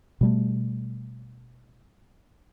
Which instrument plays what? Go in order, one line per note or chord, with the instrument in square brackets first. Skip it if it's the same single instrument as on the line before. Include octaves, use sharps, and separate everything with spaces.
[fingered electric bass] B2 G3 A3